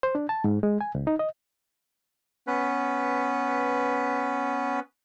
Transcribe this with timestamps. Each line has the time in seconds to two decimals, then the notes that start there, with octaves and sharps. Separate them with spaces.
0.03 C5
0.15 D4
0.29 A5
0.44 G#2
0.63 G#3
0.81 G#5
0.95 C#2
1.07 D#4
1.19 D#5
2.47 B3 C#4 B4